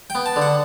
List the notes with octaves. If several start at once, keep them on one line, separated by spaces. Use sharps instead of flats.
G5
B3
A5
D3
F#5